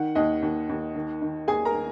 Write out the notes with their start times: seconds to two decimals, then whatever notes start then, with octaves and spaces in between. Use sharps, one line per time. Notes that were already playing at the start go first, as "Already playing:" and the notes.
Already playing: D#3 F#5
0.15 D#2 D#5
0.42 D#2
0.69 D#2
0.95 D#3
1.22 D#3
1.48 D#2 G#4 G#5
1.65 A#4 A#5
1.74 D#3